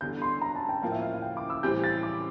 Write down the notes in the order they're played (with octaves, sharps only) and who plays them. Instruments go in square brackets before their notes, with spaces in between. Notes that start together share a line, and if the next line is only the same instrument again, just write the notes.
[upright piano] E2 D3 G3 D4 [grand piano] G6
[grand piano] C6
A#5
A5
G5
[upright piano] A2 F3 A#3 [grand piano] F5
[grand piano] E5
F5
F5
G5
D6
E6
[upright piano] A2 E3 G3 C4 G4 [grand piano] G6
[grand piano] A6
D6